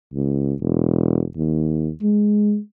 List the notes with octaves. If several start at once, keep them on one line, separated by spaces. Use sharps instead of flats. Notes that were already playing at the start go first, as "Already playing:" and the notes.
C#2
E1
D#2
G#3